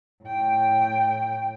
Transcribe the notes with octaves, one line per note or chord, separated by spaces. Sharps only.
A2 G5